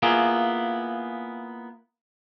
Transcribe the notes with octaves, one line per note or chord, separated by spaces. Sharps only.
A#3 B3 E4 F4 G#4